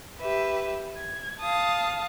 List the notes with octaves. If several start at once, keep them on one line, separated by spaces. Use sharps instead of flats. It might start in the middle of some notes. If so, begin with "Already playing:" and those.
G4 B4 E5
G#6
F5 A5 D#6